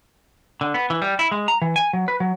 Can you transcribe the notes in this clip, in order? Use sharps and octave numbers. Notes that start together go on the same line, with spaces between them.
D3
B3
E3
G3
E4
G#3
A#5
E3
G#5
F#3
B4
F#3